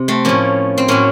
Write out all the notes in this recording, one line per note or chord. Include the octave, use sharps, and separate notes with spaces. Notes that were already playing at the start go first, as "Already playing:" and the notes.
Already playing: C3
A3 C4
A2 F3 A#3 C#4
C4
A2 F#3 A#3 C#4